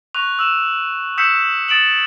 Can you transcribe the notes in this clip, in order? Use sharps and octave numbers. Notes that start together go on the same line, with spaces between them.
C#6 F#6 F7
E6 E7
D#6 E6 G6 B6 C#7 E7
D#6 A6 D7 E7 F#7